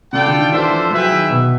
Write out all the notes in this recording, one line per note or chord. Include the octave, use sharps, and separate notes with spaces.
C#3 F4 A4 D5 G5
D3
D#3
E3 D4 F4 A4 C5 E5
F3
F#3 E4 G#4 B4 E5 G5
D#3
B2